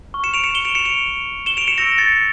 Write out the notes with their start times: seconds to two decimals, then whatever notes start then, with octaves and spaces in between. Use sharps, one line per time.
0.14 C#6 F6
0.24 C#7 E7
0.34 D7 F7
0.44 C#7 E7
0.55 E7 G7
0.65 D7 F7
0.75 C#7 E7
0.85 D7 F7
1.46 E7 G7
1.57 D7 F7
1.67 C#7 E7
1.78 C#6 E6 G6 A#6 D7
1.98 A6 C#7